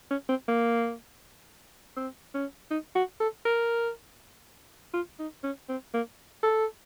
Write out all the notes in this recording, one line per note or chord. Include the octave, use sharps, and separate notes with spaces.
C#4
C4
A#3
C4
C#4
D#4
F#4
A4
A#4
F4
D#4
C#4
C4
A#3
A4